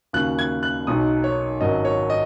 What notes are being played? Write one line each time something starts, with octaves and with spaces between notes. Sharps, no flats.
D#2 C#3 F#3 F#6
G#6
F#6
B1 B2 F#3 D#4 D#6
C#5
G#1 F#2 F#3 C#4 D#5
C#5
D#5